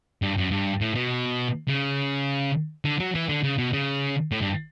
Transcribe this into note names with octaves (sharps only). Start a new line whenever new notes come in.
G2
F#2
G2
A2
B2
C#3
D3
F#3
E3
D3
C#3
B2
C#3
A2
G2